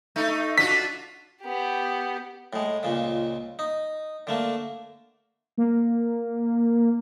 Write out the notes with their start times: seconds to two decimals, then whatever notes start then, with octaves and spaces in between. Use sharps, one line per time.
0.16 A3 D#4
0.58 D4 F4 F#4 B6
1.43 B3 G4
2.53 A2 G#3
2.83 C#2 A#2 C#3
3.59 D#4
4.27 D3 A3 A#3
5.58 A#3